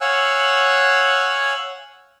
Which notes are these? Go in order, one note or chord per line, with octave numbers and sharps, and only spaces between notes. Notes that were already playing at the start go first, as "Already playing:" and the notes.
C#5 F5 F#5 G#5 E6 F#6